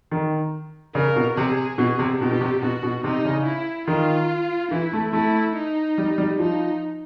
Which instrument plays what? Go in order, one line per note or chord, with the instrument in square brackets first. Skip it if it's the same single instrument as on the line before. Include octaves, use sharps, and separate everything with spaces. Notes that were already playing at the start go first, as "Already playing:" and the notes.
[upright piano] D#3
[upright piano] C#3 [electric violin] A#4
[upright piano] B2
[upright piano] C3 [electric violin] G#4
[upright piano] B2 [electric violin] G#4
[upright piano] C3
[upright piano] B2 [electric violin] G4
[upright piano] B2
C3
[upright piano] B2 [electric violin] F#4
[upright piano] B2
[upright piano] C3 [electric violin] D#4
[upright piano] C#3
[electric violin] E4
[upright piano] D#3 [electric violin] F4
[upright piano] E3 [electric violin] E4
[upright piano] A3
[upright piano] A3 [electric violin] E4
[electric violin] D#4
[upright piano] G3
G3
[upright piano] F3 [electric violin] D#4